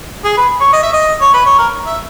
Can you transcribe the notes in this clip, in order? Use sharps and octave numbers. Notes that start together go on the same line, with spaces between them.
G#4
B4
C#5
D#5
E5
D#5
C#5
B4
C#5
A#4
E5